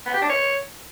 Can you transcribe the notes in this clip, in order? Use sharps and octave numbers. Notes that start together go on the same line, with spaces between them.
B3
G4
D4
C#5